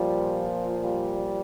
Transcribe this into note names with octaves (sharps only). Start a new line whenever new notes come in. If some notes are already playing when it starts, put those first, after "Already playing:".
Already playing: A#2 F3 G3
G3